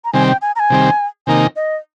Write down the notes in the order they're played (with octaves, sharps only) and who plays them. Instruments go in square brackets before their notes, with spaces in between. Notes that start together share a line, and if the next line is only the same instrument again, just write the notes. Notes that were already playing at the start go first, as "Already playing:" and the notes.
[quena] A#5
[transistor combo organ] C3 D#3 G3 C4 [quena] G#5
[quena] G5
G#5
A#5
G#5
[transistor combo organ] C3 D#3 G3 C4
[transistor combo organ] C3 D#3 A#3 D#4 [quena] G#5
[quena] D#5